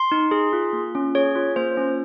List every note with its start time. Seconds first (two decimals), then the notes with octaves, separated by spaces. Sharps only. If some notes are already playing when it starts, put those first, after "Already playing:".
Already playing: C6
0.12 D#4
0.31 G#4
0.53 F4
0.73 A#3
0.95 C#4
1.15 G#4 C#5
1.35 F4
1.56 A#3 C5
1.77 C#4